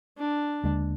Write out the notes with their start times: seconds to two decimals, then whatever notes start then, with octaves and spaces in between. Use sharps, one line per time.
0.18 D4
0.64 D#2 D3 G#3